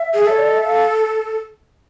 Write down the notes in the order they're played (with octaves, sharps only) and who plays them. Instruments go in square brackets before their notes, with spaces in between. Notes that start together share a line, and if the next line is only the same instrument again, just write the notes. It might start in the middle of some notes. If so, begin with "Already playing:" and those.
Already playing: [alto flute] E5
[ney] G#4
[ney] A4 [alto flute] C#5
[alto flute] D5
D#5
E5
F5